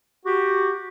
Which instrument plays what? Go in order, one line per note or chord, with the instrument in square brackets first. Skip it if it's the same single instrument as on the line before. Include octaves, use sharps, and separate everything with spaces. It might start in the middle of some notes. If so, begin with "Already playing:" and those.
[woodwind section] F#4 G4